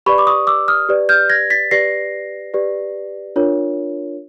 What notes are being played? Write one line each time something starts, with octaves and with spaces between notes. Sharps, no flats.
G4 B4 D5 B5 C#6
D6
C#6 D#6
D6 E6
D#6 F6
G4 B4 D5
F6 G6
G#6 A#6
A6 B6
G4 B4 D5 A#6 C7
G4 B4 D5
D4 F4 A#4 C#5